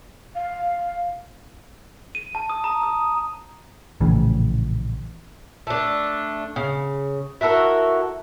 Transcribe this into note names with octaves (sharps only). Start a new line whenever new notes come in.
F5
D#7
A5
D#6
A#5
D#6
A#1 A2 C#3 E3
A3 D4
C#3
E4 F#4 A4 A#4